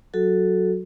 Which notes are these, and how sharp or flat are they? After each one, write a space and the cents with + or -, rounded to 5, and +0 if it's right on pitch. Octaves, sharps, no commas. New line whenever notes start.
F#3 +0 F#4 +0 A4 +0